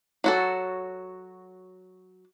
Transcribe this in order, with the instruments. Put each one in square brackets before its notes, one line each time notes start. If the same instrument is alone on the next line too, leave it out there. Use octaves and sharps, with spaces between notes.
[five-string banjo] F#3 F#4 A4